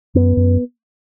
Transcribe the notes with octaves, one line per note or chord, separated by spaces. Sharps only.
F#2 B3
F#2